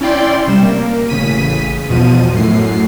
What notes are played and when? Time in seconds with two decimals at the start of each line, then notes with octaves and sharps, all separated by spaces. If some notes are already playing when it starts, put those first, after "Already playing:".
0.01 C#4 E4 D5 G5 C6
0.47 C3 G3 E7
0.63 A#3
1.09 A1 C#3 B6 D#7
1.89 E2 B2 F3 D#7
2.34 F#2 A2 C7